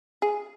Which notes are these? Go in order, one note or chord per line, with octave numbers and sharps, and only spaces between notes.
G#4